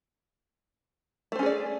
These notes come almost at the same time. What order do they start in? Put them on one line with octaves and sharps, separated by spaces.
A3 C5 C#4 G#4 D5